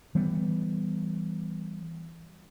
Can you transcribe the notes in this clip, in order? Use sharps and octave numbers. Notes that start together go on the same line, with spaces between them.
E3 G3 B3